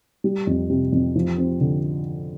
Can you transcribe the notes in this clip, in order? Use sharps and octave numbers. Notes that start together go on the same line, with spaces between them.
G3
F2
C3
F2
F3
C4
D3